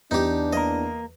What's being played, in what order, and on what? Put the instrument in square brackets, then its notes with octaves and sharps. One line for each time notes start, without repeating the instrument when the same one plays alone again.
[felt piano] E2 [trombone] D4 [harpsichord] D#4 G4
[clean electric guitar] A#3 A#4 [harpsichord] D#5